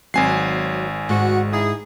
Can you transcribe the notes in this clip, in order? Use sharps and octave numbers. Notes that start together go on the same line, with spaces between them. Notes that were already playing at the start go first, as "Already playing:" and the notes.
G#1 F#3 C4 G#5 C7
G#2 F#4
D#4 E4 G#4